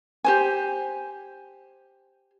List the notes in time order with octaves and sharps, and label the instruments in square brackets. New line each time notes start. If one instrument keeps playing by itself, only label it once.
[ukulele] G4 C5 G#5